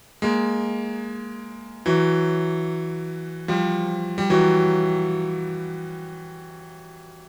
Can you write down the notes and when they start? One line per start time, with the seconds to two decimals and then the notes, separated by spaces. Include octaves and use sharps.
0.22 G#3 A#3
1.86 E3 F#3
3.48 F3 G3
4.18 G3
4.30 E3 F#3